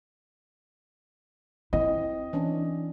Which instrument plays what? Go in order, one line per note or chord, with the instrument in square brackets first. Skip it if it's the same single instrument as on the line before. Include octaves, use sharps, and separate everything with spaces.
[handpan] C4 [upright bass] E4 [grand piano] D#5
[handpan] E3 C#4 D4